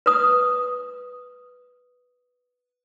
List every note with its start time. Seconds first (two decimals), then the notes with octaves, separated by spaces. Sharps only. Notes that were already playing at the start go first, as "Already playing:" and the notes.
0.06 B4 D#6